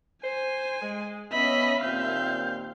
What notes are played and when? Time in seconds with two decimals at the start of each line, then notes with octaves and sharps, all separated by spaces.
0.24 C5 G#5
0.82 G#3
1.32 B3 C#4 D#5 E5 B5
1.81 D#2 A#2 C4 F5 G6